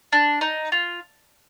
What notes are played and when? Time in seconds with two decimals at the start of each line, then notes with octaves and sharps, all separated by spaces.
0.12 D4
0.41 D#4
0.72 F4